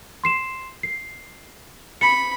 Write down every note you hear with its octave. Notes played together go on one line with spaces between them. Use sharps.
C6 C7 E7
C7
B5 C#7